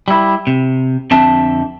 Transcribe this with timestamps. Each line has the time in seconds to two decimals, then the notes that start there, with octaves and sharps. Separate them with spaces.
0.08 G3 E4
0.47 C3
1.11 F2 D3 C4 E5 A5